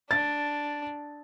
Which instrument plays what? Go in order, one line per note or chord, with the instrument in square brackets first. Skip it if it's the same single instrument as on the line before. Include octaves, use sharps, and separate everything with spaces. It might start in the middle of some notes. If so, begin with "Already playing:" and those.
[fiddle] D4 [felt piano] A6